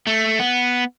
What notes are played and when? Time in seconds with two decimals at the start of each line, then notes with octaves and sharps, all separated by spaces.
0.07 A3
0.39 B3